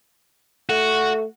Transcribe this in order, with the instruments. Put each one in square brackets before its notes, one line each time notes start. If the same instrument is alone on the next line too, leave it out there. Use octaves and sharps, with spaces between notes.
[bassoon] A3 [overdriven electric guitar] F#4